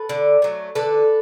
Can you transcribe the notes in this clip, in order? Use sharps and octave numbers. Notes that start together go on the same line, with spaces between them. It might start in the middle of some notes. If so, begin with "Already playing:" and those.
Already playing: A4 B4
D3
F#3 A3
D3 A4 B4